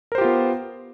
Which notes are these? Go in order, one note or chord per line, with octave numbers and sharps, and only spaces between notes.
B3 F4 G4 A#4 C5